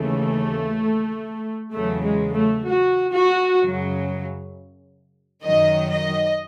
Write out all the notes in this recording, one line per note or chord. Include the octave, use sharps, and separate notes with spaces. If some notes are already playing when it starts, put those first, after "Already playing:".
Already playing: D#2 C#3 E3 A3
E2 C#3 F#3 A3
G#3
A3
F#4
F#4
F#2 C#3 F#3
F#2 D#3 F#3 D#5
D#5